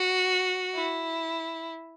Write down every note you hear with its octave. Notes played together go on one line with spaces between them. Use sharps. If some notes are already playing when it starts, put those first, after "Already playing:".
Already playing: F#4
E4